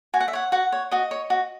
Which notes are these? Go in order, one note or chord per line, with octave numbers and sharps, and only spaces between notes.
F#4 G#5
F#5
E5
C#5 F#5
F#4 F#5
C#5
F#4 D#5
C#5
F#4